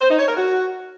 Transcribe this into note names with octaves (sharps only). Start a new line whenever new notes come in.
C5
D#4
C#5
A#4
F#4